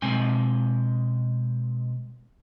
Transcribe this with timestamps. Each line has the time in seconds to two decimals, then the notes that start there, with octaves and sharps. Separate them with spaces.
0.02 B2 G#3 C4 G5 G#5